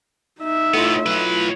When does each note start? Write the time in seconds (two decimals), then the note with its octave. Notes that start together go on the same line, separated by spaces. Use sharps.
0.41 D#4 E5
0.74 A2 A3 B3 E4 F4
1.06 F#3 B4